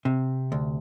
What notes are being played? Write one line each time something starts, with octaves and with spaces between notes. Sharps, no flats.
C3
D2